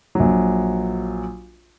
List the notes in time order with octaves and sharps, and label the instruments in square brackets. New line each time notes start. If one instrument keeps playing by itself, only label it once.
[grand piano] A#1 F#3